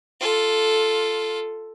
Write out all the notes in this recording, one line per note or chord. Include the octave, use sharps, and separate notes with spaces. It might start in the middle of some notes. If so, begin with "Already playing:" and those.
F4 A4